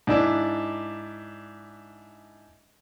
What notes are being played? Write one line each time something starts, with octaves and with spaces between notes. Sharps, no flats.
G#2 D4 E4 D5